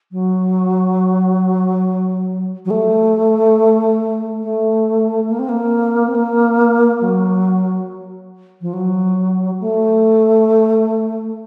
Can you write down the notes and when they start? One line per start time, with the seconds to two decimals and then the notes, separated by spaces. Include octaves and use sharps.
0.12 F#3
2.65 F#3
2.70 A3
4.43 A3
5.29 A#3
5.39 C4
5.49 A#3
6.07 C4
6.15 A#3
7.01 F#3
8.61 F3
8.73 F#3
9.60 A3